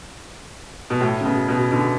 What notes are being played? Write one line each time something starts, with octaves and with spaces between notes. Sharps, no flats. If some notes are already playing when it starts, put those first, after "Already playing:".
B2
A2
C#3
B2
B2
B2 D3